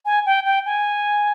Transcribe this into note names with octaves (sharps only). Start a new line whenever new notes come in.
G#5
G5
G5
G#5